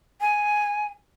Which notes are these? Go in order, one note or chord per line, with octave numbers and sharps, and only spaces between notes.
G#5